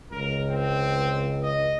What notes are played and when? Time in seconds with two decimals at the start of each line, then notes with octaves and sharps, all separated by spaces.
0.12 C#2 A#4
0.50 C4
1.43 D#5